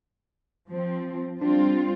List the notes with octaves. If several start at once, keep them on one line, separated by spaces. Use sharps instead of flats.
F3 C4
G3 C4 D4 F4